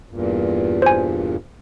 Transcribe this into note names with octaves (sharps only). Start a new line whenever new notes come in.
E2 G2 A#2
C5 G#5